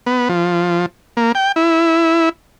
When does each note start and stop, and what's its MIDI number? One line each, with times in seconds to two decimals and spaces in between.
0.06 0.29 59
0.29 0.86 53
1.17 1.32 58
1.35 1.52 79
1.56 2.29 64